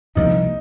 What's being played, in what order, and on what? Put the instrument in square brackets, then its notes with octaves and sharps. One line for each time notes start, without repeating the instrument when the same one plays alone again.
[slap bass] C2 C3 F3 A#3 [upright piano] D#4